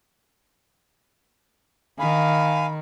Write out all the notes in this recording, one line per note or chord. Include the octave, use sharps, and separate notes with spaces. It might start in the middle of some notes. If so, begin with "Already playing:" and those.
D#3 F5 G#5 B5